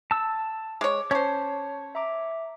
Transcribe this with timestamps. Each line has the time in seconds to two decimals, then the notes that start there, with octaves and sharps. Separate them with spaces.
0.11 A5 E6
0.81 G#3 C#5 D6
1.11 C#4 C5 C#5 A5
1.95 E5 A#5 D6